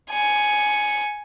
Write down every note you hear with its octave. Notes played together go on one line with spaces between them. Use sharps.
G#5 C#7